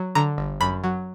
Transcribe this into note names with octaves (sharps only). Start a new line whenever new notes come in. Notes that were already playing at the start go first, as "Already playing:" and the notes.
Already playing: F#3
D3 A#5
G1
F#2 B5
F#3